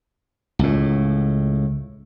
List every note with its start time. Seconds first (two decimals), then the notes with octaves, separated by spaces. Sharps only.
0.59 C#2 A2